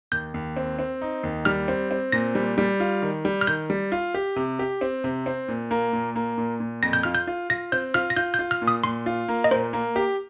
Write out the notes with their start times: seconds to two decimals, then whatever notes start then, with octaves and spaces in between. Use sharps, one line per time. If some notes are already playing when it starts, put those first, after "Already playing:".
0.12 D#2 G6
0.34 D#2
0.57 C4
0.79 C4
1.01 D#4
1.23 D#2
1.45 G3 F6
1.68 C4
1.91 C4
2.12 A#2 A#6
2.35 G3
2.58 G3
2.80 F4
3.02 D#3
3.25 G3
3.41 F6
3.47 D#3 G6
3.70 G3
3.92 F4
4.15 G4
4.36 C3
4.59 G4
4.81 C4
5.04 C3
5.26 C4
5.48 A#2
5.71 A#3
5.93 A#2
6.16 A#3
6.38 A#2
6.60 A#2
6.83 F2 A#6
6.93 G6
7.03 F4 F6
7.15 G6
7.27 F4
7.50 F4 A#6
7.72 C4 G6
7.94 F4 F6
8.10 A#6
8.17 F4 G6
8.34 G6
8.39 F4
8.51 F6
8.62 A#2
8.68 D#6
8.84 A#2 C6
9.06 F4
9.28 A#3
9.44 D#5
9.51 A#2 C5
9.73 A#3
9.96 G4